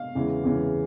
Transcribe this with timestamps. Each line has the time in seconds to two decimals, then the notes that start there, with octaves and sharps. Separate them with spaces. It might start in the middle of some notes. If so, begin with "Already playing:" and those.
Already playing: F5
0.15 E2 C#3 E3 G#3
0.43 E2 C#3 E3 G#3